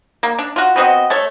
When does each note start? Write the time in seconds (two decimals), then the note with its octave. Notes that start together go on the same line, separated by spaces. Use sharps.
0.23 A#3
0.39 D4
0.56 F4 F#4
0.76 B3 C4 F#4 D#5
1.10 A3 A4 C#5